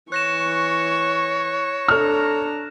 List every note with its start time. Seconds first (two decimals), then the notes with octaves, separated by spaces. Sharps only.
0.12 E3 C#5 C#6 F#6 A#6 E7
1.88 D4 A4 A#5 F6